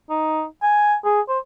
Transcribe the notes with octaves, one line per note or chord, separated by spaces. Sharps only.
D#4
G#5
G#4
C5